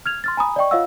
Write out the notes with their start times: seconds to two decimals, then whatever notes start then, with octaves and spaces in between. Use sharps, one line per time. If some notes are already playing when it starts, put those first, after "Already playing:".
0.06 F6 G#6 F7
0.24 C6 F6 A6
0.37 G#5 A#5 B5 D#6
0.56 D5 D#5 G5 C#6
0.71 F4 C#5 D#5 F5 F#5 E6